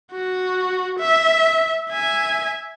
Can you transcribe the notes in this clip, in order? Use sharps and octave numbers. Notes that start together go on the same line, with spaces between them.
F#4
E5
E5 G#5